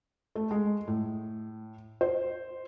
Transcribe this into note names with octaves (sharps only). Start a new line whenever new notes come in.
A3
G#3
A2
C5